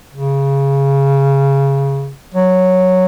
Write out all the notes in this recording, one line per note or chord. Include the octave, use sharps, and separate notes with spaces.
C#3
F#3